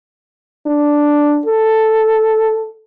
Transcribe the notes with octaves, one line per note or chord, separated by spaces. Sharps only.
D4
A4